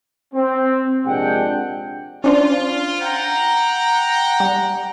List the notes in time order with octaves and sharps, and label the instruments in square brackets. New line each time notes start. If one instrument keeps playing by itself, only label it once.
[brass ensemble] C4
A#1 C3 G#3 D4 F#5 G5
[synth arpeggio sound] C#4 D4 C5 [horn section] F4
[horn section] F#5 G5 A#5
[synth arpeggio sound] G3